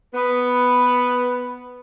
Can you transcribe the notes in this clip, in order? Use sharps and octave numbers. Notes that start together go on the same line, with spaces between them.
B3 B4